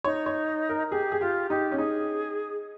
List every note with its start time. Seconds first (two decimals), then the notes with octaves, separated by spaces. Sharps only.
0.04 D#4 C#5
0.26 C#5
0.69 A#4
0.91 G4 G#4
1.12 G#4
1.21 F4 G4
1.50 D#4 G4
1.71 C#4
1.78 D#4 G#4